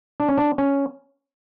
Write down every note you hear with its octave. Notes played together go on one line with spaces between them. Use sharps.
D4
C#4
D4
C#4